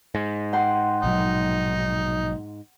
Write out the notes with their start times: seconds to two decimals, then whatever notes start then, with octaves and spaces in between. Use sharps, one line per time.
0.15 G#2
0.53 F#5 G5 C6
1.03 A#1 B2 F#3 D#4